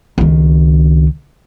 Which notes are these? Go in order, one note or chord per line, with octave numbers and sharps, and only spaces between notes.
C#2 D#3